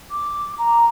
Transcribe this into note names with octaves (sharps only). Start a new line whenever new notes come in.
D6
A#5